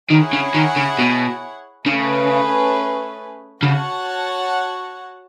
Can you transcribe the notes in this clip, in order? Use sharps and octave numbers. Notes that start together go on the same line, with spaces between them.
D#3 E4 G#4 C#5 F#5
C#3
D#3
C#3
B2
C#3 A3 C#4 G#4 B4
C#3 F#4 C#5 F#5 A5